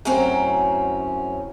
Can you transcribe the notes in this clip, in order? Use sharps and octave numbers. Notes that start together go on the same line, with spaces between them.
F#2 A2 F#3 C4 C#4